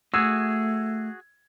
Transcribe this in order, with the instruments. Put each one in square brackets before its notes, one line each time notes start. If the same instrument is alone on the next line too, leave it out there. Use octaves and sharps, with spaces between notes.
[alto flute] A3 [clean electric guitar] F#4 G#4 [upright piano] E6 G#6